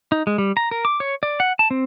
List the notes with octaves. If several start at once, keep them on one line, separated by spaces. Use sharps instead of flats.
D#4
G#3
G3
A#5
A#4
D6
C#5
D5
F#5
A5
C4